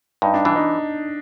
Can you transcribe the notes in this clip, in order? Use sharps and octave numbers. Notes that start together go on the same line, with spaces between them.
G2 D#4
D4
E3 D4
D#4